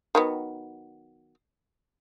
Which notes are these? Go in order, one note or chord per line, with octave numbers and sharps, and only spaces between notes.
D#3 F#3 B3